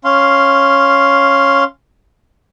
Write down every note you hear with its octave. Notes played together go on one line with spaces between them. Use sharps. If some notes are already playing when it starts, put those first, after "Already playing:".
C#4 F5 C6